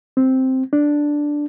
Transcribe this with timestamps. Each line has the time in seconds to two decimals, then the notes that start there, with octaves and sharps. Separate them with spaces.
0.17 C4
0.73 D4